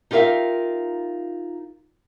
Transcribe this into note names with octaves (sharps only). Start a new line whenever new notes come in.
D#4 F4 G4 A#4 E5 F5